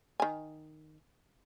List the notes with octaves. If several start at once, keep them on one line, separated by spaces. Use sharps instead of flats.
D#3 G#5